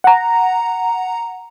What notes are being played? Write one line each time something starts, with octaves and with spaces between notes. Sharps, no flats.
F#5 A#5